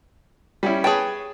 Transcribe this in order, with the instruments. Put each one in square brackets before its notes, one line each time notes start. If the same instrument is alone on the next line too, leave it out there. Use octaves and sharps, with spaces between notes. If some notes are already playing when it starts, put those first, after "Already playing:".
[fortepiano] G3 C#4 E4
[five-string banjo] G#4 G5 [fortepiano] B4 C#5 A5